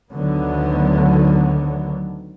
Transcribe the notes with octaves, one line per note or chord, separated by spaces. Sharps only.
D2 D3 D#3 F#3 B3